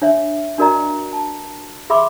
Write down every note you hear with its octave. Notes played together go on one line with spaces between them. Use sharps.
D4 C#5 E5
D4 F#4 A#4 D5 D#5 A#5
A5
G#4 E5 B5 C6 D6